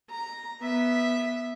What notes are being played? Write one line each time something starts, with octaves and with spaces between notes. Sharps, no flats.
A#5
B3 E5